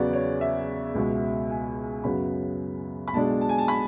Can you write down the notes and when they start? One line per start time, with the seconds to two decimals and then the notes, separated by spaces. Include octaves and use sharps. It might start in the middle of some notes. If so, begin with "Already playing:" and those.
Already playing: E2 C#3 F#3 B3 D5
0.13 C#5
0.41 E5
0.95 C#2 B2 G#3
1.50 G#5
2.04 F#2 C#3 F#3 B3 B5
3.08 B5
3.13 B1 B2 G#3 D4 A5
3.41 A5
3.49 G#5
3.58 A5
3.68 B5